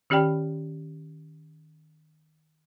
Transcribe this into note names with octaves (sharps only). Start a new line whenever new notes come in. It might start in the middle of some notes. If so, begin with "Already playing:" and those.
D#3 C#4 G4 D5 G5 B5